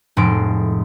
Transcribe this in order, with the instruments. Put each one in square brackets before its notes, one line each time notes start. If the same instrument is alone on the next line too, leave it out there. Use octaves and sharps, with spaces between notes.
[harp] F1 A2 G#3 C6 D7